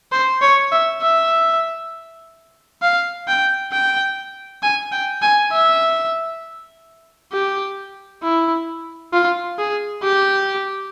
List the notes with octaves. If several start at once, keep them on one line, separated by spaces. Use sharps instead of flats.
C5
C#5
E5
E5
F5
G5
G5
G#5
G5
G#5
E5
G4
E4
F4
G#4
G4